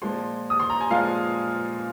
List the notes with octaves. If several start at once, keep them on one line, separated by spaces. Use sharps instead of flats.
A#2 F3 G#3 C6
D#6
C6
A#5
G#5
A#2 F3 G#3 F5